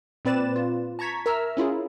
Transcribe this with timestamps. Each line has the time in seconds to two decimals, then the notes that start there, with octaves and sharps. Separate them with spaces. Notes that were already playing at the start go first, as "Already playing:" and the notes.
0.25 A#2 C4 B4 D5 A6 E7
0.56 F4
0.99 A5 A#5 C#6 G#6 B6
1.26 A#4 E5 A#5 E6 F6
1.57 C#4 E4 F4 G#4